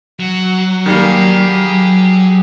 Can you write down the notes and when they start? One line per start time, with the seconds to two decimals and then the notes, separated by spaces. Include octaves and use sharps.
0.20 F#3 F#5
0.86 D#3 G3 A#3 G4 G#4